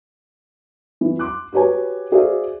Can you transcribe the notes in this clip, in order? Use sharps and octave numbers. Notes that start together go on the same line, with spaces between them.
E3
C6 D6 F#6
F#4 G4 B4 C#5 G#5
F#4 G#4 C5 D5 E5 F5